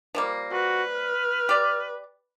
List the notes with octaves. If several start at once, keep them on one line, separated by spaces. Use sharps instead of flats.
F3 G3 A#3
F#4 B4
F6
G4 D5